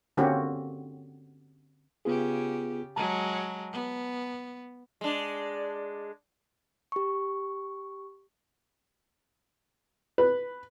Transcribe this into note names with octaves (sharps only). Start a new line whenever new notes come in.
D3 A#3 C4 C#4 F#4 G4
C#3 B3 F4 G4 G#4
F#3 G#3 A5 A#5
B3
G#3 D4
G4 C#6
B4